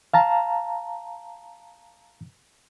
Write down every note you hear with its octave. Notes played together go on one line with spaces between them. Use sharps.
F5 A5 A#5